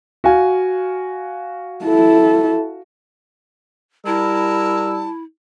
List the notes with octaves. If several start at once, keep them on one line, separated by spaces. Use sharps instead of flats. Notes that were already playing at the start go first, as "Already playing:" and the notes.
F#4 F5 G#5
E4 A4
G3 E4 A#4 A5 E6